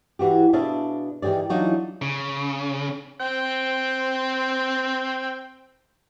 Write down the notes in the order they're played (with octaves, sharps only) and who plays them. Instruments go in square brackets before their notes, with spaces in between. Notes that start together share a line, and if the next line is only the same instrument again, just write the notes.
[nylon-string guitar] E3 F#4 G4
B2 D4 G#4 E5 F5 A5
D#3 E3 G4 G#4 D5
E3 F#3 D4 D#4 F4
[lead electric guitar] C#3
[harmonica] C4 G5